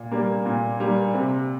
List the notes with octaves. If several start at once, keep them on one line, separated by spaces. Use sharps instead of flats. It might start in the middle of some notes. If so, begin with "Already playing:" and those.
Already playing: A#2
G3 A#3
A#2
G3 A#3
C3